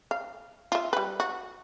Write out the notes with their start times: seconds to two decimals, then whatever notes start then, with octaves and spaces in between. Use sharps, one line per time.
0.11 F5
0.72 F4 E5
0.93 G3 B4
1.20 F#4